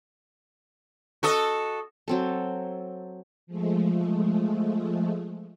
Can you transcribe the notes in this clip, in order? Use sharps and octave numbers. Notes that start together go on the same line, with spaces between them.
F#4 A4 D#5
F#3 C4 A4
F3 G#3 A3